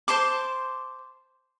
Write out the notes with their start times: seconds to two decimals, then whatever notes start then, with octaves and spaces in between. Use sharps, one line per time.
0.08 C5 A5 C6 D6